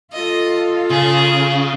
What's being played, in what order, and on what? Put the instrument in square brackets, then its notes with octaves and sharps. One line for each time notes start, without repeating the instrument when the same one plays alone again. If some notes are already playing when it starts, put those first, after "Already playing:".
[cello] F4 A4 [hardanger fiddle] D#5
[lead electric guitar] C#3 [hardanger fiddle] G#4